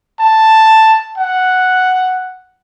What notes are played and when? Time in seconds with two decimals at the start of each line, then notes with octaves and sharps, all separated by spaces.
0.20 A5
1.18 F#5